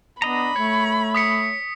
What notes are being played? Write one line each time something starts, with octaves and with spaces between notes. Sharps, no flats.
B3 D4 D#5 A#5 B5
A3 C#5
D#6 B6 C#7